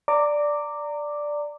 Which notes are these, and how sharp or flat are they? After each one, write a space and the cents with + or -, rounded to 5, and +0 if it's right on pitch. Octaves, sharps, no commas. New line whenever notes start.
D5 +0 A#5 -25 D6 +0